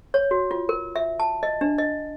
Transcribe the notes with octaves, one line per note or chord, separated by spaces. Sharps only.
C#5
F#4
F4
A#4
E5
A5
D#5
D4
D#5